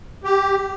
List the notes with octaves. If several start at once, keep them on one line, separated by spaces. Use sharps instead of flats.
G4